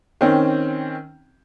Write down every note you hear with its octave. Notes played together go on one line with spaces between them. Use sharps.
D#3 C4 C#4